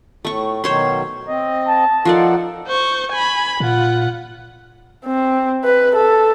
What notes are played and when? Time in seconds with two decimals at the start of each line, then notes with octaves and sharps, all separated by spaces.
0.25 A2 A3 C#6
0.64 B2 D#3 F#3 C5 C#5 C6
1.27 C4 D#5
1.68 A5
2.05 F3 D#4 A4 A#4 D5 F#5
2.68 C5 C#6
3.12 G#5 B5
3.60 A#2 F4 F#5
5.06 C4
5.64 B4
5.96 A4